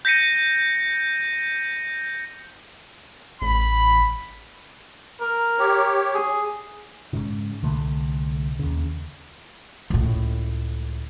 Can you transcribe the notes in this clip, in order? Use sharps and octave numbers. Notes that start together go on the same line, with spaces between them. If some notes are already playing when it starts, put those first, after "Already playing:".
G6 A#6 B6 C#7 D#7
A1 B5
A#4
G4 C#5
G#4
G#2 C#3
C2 D3 A3
D#2 C#3
C#2 A2